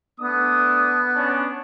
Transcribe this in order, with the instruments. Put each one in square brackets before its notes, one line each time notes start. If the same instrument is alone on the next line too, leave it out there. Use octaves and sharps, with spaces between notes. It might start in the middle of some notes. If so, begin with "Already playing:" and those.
[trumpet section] A3 D4 D#6 [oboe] B3
[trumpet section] C#4 D4